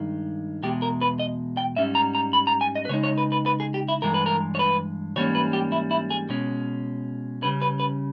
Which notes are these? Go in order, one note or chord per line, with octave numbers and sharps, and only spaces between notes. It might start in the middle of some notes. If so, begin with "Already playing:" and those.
Already playing: G2 D#3 G#3
E2 B2 G#3 G4
A#4
B4
D#5
G5
G#2 G3 C#4 E5
A#5
A#5
B5
A#5
G#5
D#5
B4
C#3 G#3 D#4 C#5
C#5
B4
B4
B4
G#4
G4
E4
G2 E3 G#3 A#4
B4
A#4
C#5
B4
G#2 E3 G3 A#3 C#4 C#5
B4
G4
E4
E4
G#4
B2 G#3 C#4
C#3 G3 C#4 B4
B4
B4